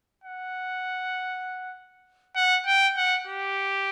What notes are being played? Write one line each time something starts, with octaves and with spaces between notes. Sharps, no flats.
F#5
F#5
G5
F#5
G4